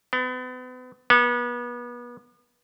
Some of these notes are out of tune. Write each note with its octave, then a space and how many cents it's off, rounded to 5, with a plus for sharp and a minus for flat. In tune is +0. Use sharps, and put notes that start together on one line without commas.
B3 +40
B3 -30